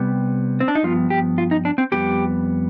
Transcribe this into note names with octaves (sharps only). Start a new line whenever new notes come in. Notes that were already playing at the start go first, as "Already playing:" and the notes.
Already playing: C3 G3 B3
C4
D4
D#4
G2 F3 B3 F4
G4
F4
D#4
D4
C4
F2 C3 G3 B3 G4